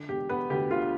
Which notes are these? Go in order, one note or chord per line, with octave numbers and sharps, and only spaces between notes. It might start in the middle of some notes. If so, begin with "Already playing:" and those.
Already playing: D3
E1 G4
E1 B3 B4
D2 G4
D3 F4